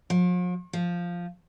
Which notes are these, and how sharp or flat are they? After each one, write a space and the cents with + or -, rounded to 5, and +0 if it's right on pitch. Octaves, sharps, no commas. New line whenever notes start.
F3 +45
F3 +0